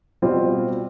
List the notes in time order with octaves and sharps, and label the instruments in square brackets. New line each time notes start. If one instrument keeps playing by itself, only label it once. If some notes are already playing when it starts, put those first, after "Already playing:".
[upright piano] B2 G3 C4 F4